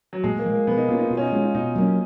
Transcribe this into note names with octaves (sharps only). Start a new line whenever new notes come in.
F#3
A#2 G#3
A#3
F3 G#3
A#3
B2 B3
D#4
A#3 C#4 F4
D#4
B2 F4
C#4
D#4
G#3 C#4 F4
D#4
B2 D#4
F#3 A#3 C#4